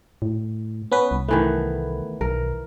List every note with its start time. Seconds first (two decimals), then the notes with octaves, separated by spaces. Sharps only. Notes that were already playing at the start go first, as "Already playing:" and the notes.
0.22 A2
0.92 B3 C#4 B4
1.11 C2
1.28 D#3 E3 A3 B3
2.21 B1 A#4